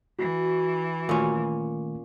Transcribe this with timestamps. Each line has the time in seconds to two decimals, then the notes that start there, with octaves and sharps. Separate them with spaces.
0.19 E3 F#4
1.09 A#2 D#3 A3 C#4